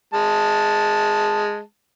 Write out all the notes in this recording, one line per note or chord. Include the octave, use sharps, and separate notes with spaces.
G#3 A5